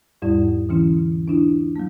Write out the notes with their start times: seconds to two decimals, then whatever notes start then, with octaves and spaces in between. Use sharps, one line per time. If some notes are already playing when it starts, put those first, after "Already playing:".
0.22 E2 G#2 G3 E4 D5
0.69 D3 E3 C#4 E4
1.28 D4 E4 F4
1.76 F#3 A#3